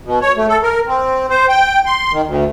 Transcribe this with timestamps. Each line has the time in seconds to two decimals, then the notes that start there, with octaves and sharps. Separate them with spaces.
0.05 B2
0.21 C#5
0.37 A3
0.48 A4
0.63 A#4
0.87 C4
1.30 C5
1.49 G5
1.86 C6
2.13 D#3
2.26 D2